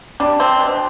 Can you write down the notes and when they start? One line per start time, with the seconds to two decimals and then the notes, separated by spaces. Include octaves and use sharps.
0.20 G3 D4
0.40 C4
0.59 B2